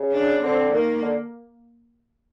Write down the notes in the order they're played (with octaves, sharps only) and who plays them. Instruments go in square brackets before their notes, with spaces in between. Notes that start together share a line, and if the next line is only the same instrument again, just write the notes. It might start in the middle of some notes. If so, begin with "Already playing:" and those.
Already playing: [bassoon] C#3
[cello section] D4
[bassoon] D3 [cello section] C4
[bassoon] D#3 [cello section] A#3
[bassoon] D3